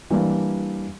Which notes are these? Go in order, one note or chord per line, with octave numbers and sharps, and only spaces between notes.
E3 G3 A#3 D4